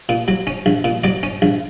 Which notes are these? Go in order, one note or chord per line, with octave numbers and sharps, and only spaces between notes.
A#2
F#3
C#4
A#1
A#2
F#3 D5
C#4
A#1